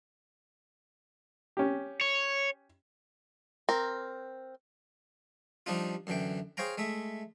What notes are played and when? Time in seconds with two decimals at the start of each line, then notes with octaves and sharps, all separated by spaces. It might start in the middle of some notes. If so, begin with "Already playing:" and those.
1.57 C#4 G4
2.01 C#5
3.69 C4 A#4
5.66 F3 G3 D4 D#4 F4
6.07 F#2 D3 E3 G5
6.57 G#4 C5 C#5 F5 G5 A#5
6.78 G#3 A3 E5